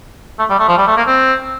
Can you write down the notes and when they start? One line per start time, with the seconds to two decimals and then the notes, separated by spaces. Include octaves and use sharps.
0.39 A3
0.50 G3
0.59 A3
0.68 F3
0.78 G3
0.87 A3
0.97 A#3
1.07 C4